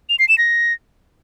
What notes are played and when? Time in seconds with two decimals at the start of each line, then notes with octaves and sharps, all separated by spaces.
0.09 F7
0.19 C7
0.29 E7
0.38 A#6